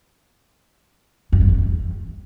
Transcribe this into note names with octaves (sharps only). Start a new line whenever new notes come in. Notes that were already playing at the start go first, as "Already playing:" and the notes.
F#2
G2
E2